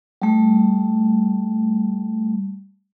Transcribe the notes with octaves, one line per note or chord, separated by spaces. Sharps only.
G3 A3